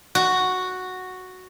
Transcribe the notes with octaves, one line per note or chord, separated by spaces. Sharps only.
F#4